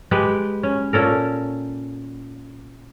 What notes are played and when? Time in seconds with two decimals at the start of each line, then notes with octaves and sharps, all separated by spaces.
0.11 G#3 G4 B4 G5
0.63 C#4
0.93 A#2 C#4 A4 A#4